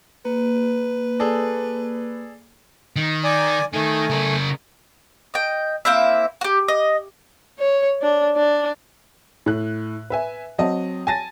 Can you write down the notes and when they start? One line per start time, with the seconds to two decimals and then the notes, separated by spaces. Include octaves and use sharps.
0.25 A#3 B4
1.20 G#4 A4 D5
2.96 D#3
3.24 D5 G#5
3.73 D#3 A3 G#5
4.10 C#3 A#4
5.34 D#5 G5
5.85 A#3 C4 E4 E5
6.41 F#4 G4
6.68 D#5
7.59 C#5
8.02 D4
8.36 D4
9.46 A2 F#6
10.10 B4 E5 G#5
10.58 F#3 C4 D#5 A5
11.07 G#5 A5 A6 A#6 D#7